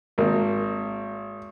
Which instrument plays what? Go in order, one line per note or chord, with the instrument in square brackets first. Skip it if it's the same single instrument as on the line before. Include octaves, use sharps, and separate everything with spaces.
[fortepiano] G#1 A#3